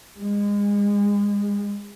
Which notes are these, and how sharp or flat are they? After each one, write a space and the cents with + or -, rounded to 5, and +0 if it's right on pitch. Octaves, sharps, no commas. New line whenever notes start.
G#3 -30